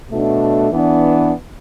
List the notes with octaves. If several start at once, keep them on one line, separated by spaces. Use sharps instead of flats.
B2 A3 D4
E3 B3 D4